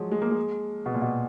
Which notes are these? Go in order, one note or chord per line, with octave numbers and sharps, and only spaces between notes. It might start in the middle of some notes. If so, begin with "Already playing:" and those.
Already playing: F3 F#3 G#3
G#3
A#3
G#3
B2
A#2
B2